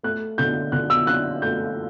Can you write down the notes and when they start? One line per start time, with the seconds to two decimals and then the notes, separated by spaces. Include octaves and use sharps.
0.03 A3 F#6
0.38 D3 G6
0.72 D3 F#6
0.90 E6
1.07 D4 F#6
1.42 A3 G6